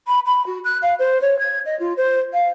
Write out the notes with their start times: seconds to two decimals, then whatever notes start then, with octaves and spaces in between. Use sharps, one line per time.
0.07 B5
0.26 B5
0.46 F#4
0.64 F#6
0.82 F5
0.99 C5
1.21 C#5
1.39 G#6
1.65 D#5
1.79 F4
1.97 C5
2.33 F5